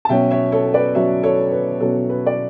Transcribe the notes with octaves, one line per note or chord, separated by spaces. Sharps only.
A5
B2 F#3 C#4 E5 G5
C#5 E5
A4 C#5
B4 D5
B2 F#3 C#4 C#5 E5
A4 C#5
B4
B2 F#3 C#4 A4
B4
D5